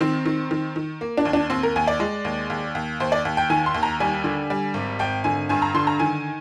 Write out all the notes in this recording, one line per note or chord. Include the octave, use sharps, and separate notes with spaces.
D#3 C4
D#3
D#3
D#3
A#3
D4
D#2
D4
D#2 C4
A#4
D#2 G#5
D5
G#3
D#2
D#2
D#2
D#2 C5
D5
D#2
G5
D#3 G#5
C6
D#2
A#5
G3 G#5
D3
G3
G#1
G#1 G5
D3 G#5
G2 G#5
A#5
D3 C6
A#5
D#3 G#5